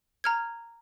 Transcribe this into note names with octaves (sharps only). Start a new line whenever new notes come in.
A#5 F6 G#6